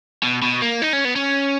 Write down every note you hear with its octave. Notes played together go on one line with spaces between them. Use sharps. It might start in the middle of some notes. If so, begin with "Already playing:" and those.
B2
B2
A#3
D#4
C#4
B3
C#4